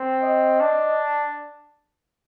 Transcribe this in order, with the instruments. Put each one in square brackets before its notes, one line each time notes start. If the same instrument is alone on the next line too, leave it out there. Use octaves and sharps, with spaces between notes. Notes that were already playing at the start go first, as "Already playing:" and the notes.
Already playing: [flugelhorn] C4
[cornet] D#5
[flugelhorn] D4